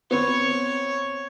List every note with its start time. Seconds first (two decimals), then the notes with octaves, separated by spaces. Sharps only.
0.11 B3 C4 C#5